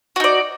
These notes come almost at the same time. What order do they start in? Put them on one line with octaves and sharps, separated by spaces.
F#4 D#4 D5